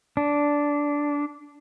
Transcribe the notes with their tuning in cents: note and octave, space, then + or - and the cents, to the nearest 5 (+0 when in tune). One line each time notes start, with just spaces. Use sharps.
D4 -10